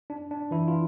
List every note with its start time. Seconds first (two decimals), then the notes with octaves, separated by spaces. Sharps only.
0.10 D4
0.31 D4
0.51 E3 E4
0.68 F4